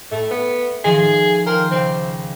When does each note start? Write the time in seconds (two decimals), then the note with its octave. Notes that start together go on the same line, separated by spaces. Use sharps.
0.11 A2 A3
0.31 B3
0.84 D#3 F3 G#4 A6
1.46 F4 A#4 C5 G5
1.71 C#2 C4